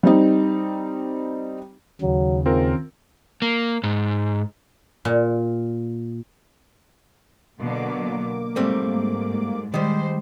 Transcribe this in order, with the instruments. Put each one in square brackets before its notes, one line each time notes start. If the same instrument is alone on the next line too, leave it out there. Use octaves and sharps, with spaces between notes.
[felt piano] G3 C4 D#4
[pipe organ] D#2 C#3 [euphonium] F#3
[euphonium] G#2 [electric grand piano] C4 F4 A#4
[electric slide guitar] A#3
G#2
[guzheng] A#2
[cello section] B2 D3 F#3 [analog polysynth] A#3 D6
[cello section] G#2 [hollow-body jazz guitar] G3 A3 C4
[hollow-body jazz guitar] D#3 G3 [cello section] G#3 C5